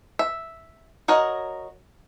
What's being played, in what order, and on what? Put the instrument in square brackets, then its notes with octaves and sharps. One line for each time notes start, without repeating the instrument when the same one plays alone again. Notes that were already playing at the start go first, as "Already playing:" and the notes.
[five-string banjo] E5
F#4 A#4 C#5 D#5